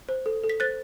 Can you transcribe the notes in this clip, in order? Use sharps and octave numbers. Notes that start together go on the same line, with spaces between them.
C5
A4
A4
B6
C5 F#6 A6